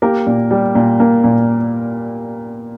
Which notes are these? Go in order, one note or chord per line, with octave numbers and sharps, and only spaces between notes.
A#3 G4 A#4
A#2
G3
A#2
A#3
A#2